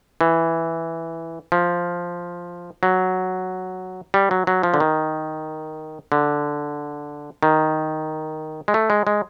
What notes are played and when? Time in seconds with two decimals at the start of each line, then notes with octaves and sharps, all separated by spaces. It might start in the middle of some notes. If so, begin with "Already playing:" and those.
0.21 E3
1.52 F3
2.83 F#3
4.14 G3
4.31 F#3
4.47 F#3
4.63 F3
4.74 D3
4.80 D#3
6.12 D3
7.43 D#3
8.68 G#3
8.74 A3
8.90 G#3
9.07 G#3